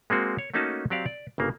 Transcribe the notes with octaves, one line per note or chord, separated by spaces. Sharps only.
G#3 A#3 C4 F#4
C#5
A3 A#3 C#4 D#4 F#4 A5
F#3 C4 G4 D5 F5
D5
G1 C#3 A#3